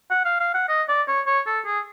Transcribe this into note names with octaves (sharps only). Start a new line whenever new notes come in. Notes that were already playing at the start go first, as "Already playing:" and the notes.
F#5
F5
F5
F#5
D#5
D5
C#5
C#5
A4
G#4